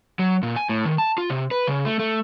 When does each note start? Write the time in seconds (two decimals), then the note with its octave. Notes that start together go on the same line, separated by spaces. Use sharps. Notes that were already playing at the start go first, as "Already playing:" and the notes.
0.19 F#3
0.43 A#2
0.56 G#5
0.69 A2
0.85 D#3
0.98 A5
1.18 F4
1.30 C3
1.51 B4
1.67 C#3
1.85 A3
1.99 A3